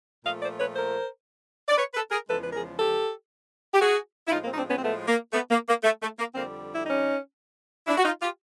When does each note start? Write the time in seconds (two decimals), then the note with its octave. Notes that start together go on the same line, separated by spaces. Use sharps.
0.24 A#2 F3 A3 D#5 F5
0.42 C5 D5
0.59 B4 C#5
0.76 A#4 C5
1.68 D5
1.77 B4 C#5
1.94 A4 B4
2.11 G#4 A#4
2.27 E2 C#3 F3 G#3 A4 B4
2.41 B4
2.53 G#4 A#4
2.79 G4 A4
3.74 G4
3.80 F#4 G#4
4.27 E4
4.32 A2 F3 G#3 D#4 F4
4.44 A#3 C4
4.52 D#4
4.57 C4 D4
4.69 B3 C#4
4.77 C4
4.83 A3 B3
5.07 A#3
5.33 A3 B3
5.50 A#3
5.68 A#3
5.84 A3
6.02 A3
6.19 A#3
6.35 F2 D3 G3 A#3 C4
6.74 E4
6.86 C#4 D#4
7.87 D4 E4
7.97 F#4
8.04 D#4 F4
8.22 F4 G4